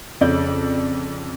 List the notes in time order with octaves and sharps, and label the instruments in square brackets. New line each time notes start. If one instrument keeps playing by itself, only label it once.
[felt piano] F2 C#3 D5 G6